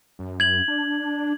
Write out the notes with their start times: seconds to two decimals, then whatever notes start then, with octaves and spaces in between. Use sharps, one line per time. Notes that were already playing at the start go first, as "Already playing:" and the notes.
0.19 F#2
0.40 G#6 F#7
0.68 D4